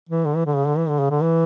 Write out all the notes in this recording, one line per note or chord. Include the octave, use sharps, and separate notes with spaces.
E3
D3
E3
D3
C#3
D3
E3
D3
C#3
D3
E3